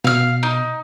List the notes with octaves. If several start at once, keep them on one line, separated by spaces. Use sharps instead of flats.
B2 F5 F6
D#4